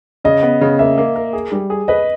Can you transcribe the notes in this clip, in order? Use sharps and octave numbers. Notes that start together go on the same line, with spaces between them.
C#3 D#5
B3
C#3
A#3 E5
A#3
A#4
G#4
G3
G#4
B4 D#5